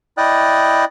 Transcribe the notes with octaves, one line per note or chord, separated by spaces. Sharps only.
E4 D5 D#5 G5 D#6 F#6